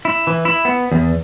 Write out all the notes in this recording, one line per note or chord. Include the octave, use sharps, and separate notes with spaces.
E4
E3
E4
B3
E2